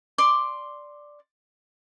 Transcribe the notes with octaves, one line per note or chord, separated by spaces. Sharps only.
D5 C6 D6